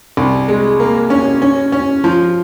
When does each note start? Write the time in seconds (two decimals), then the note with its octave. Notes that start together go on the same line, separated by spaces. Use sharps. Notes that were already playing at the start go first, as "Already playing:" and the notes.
0.17 C2
0.48 G#3
0.80 A#3
1.10 C#4
1.42 C#4
1.72 C#4
2.04 F3